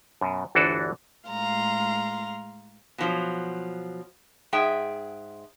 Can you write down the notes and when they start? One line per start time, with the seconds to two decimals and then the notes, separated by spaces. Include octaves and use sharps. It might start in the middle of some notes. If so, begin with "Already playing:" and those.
0.21 F#2 B2
0.55 G1 D2 E3 D4 F#4 A4
1.28 A2 G#3 F5 A#5 C6
2.98 B2 F3 F#3
4.53 G#2 G#4 E5 G5